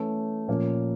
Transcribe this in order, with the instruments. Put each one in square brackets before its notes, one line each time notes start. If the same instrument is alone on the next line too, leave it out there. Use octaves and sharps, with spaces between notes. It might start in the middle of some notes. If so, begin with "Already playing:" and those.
Already playing: [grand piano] E3 A3 C#4
A#2 F3 A#3 C#4